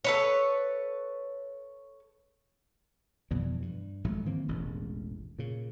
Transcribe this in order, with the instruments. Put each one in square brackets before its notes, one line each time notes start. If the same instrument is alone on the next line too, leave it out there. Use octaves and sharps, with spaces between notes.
[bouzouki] A4 B4 C#5
[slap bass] F2 B2 E3 G3
G2
G#1 G#2 F#3 A3
D#3 E3 A#3 C4
E1 A1 G#2
A#2 C#3